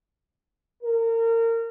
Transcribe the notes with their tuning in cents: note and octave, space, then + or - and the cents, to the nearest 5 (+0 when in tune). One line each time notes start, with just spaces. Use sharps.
A#4 -30